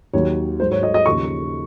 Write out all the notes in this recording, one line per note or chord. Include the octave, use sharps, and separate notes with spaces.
D#2 D#3 F#3 C#5
G#2 F#3 C5
C#5
D#5
D#5
D#2 C#3 F3 C#6